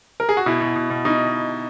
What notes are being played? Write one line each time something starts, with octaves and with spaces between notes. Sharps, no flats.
A#4
G#4
F#4
B2 E4
B2
B2
B2
B2 D#4